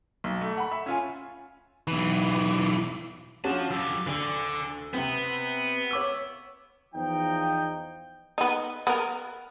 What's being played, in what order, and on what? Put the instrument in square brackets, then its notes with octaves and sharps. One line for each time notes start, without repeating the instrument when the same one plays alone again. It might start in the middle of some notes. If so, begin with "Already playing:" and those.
[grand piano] B1
A3
F#5 B5
E5
C#4 F4 G#5
[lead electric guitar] B1 E3
[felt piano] C#4 D4 F#4 [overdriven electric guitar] F4 A5
[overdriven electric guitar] F3 G4 [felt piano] E6
[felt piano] D2 [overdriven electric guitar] D3
[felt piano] C3 C4 [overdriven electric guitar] B3
[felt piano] C#5 D6 E6
[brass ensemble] E2 F3 D#4 G5
[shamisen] B3 D#4
B3 A#4